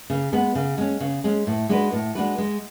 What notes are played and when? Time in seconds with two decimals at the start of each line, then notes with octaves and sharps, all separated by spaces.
0.10 C#3
0.33 G#3 B3
0.55 C#3
0.78 G#3 C#4
1.00 C#3
1.24 G#3 C#4
1.47 A2
1.69 G#3 D4 F#4 B4
1.92 A2
2.15 G#3 D4 F#4 B4
2.38 G#3